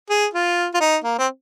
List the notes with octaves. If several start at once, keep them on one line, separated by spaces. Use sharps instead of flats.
G#4
F4
F4
D#4
A#3
C4